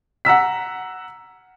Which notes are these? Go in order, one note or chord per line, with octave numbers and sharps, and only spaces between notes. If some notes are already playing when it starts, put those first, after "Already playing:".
F#5 A#5 E6 B6